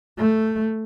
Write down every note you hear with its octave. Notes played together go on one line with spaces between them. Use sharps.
A3